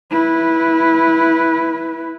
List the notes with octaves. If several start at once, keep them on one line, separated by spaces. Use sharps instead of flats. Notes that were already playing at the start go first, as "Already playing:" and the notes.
E4 B4